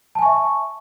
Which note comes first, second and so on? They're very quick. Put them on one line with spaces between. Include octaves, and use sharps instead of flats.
A5 G#5 C#6 E5